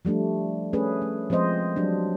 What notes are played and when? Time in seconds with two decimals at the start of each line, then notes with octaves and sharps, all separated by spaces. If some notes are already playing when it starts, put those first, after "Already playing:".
0.05 F3 G3 A3 D4
0.73 A3 C#4 G#4 B4
1.02 A3
1.30 F3 G#3 C4 C5 D#5
1.76 F#3 G3 D4